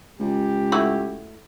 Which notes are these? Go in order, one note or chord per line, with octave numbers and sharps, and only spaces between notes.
C#2 G4
A3 E4 F#4